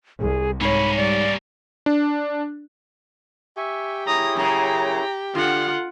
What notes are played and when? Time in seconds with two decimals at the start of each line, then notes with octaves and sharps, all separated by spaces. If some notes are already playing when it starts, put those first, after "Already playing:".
0.20 C2 G#4
0.61 G#2 A#3 C#4 C#5 B5
0.97 G3 D5
1.86 D4
3.57 G4 E5 G#5 C#6
4.07 E4 G#4 C#5 A#5 D#6
4.37 F#2 C#3 A#5
5.35 D3 F4 F#5 F6